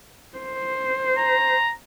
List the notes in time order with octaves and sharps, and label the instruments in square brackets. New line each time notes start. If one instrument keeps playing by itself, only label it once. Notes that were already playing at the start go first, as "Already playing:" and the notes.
[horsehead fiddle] C5
[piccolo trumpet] A#5